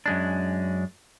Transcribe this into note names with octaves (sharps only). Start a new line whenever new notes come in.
F#2 G#3 D4